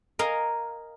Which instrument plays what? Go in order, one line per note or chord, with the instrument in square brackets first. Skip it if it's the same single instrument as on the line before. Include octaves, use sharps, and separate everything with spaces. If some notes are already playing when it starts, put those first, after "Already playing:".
[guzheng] A#4 D#5 F5 G#5